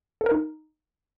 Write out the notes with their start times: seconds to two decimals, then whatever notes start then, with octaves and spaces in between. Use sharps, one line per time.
0.21 A4
0.26 A#4
0.31 D#4